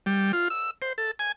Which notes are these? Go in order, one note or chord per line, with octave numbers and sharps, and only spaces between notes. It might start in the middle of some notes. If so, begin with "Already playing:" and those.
G3
F4
E6
C5
A4
G#5